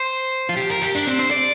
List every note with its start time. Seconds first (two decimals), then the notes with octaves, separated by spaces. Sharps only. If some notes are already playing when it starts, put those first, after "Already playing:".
Already playing: C5
0.49 F4
0.57 G4
0.70 A#4
0.82 G4
0.95 D4
1.07 C4
1.19 C5
1.31 D5